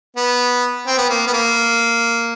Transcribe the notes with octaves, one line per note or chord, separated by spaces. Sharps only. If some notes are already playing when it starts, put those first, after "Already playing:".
B3
C4
B3
A#3
B3
A#3